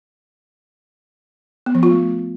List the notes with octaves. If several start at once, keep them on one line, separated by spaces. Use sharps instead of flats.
B3
F3
F4
A3